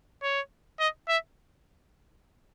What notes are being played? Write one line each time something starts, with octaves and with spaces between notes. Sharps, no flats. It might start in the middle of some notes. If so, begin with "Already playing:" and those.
C#5
D#5
E5